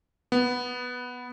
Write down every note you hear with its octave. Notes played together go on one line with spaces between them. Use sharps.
B3